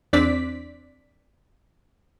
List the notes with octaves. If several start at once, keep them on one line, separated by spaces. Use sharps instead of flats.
E2 C4 D4 D5 B6